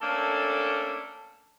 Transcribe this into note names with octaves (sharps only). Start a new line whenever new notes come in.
A3 A#3 C#4 D4 A4